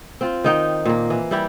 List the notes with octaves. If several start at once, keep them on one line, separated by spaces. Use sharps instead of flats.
C4 F4
D#3 D#4 G5
A#2 A#3
E3
G3 E4 G4